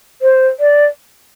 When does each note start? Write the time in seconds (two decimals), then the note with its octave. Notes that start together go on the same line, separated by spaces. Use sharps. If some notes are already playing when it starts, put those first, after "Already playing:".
0.22 C5
0.60 D5